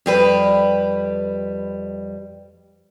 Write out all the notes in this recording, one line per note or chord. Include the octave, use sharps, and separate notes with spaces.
F2 G3 B4